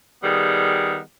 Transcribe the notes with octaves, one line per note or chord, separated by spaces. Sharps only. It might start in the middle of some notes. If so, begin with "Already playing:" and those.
D#3 G3 B3 G#4